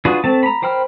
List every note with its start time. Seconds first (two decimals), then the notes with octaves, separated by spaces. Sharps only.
0.05 D4 F4 F#4 G#4 B4
0.24 A3 C4 A5
0.43 A#5 B5
0.62 A#4 C5 G5 B5 F6